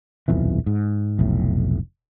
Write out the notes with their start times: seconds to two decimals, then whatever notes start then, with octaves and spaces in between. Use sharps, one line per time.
0.28 D#1 B1 F2 E3
0.66 G#2
1.19 F1 B1 A2